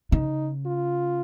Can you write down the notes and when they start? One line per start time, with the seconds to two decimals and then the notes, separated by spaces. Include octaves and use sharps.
0.12 C#3 D#4
0.66 F4